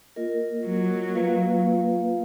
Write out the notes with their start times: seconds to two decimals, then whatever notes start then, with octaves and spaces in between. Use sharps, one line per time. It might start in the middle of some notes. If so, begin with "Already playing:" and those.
0.16 A#3 F4 A#4 D#5
0.66 F#3
1.15 A#3 F4 B4 F5